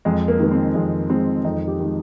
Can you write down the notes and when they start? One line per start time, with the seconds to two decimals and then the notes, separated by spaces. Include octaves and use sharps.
0.05 F2 G#3
0.28 A#3
0.39 D#3 G#3 A#3
0.51 C4
0.75 F2 G#3
1.09 D#3 G#3 C4
1.45 F2 D#4
1.68 G4
1.80 D#3 G#3